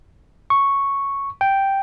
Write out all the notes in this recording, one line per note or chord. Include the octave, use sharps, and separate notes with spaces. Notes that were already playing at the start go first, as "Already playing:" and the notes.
C#6
G5